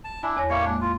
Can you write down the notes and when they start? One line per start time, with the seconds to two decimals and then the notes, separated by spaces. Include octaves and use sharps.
0.04 A5
0.23 D4 E4 G#5
0.37 E2 C#5 A#6
0.50 A2 G3 A#3 C#5 E5
0.65 G#3 A#3 D4
0.81 F4